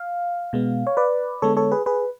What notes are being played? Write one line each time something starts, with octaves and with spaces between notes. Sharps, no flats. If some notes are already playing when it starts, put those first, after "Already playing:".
Already playing: F5
B2 G#3 B3
C#5
B4 D5
D3 G#3 B3 A4 C#5
A4 C#5
G#4 B4
G#4 B4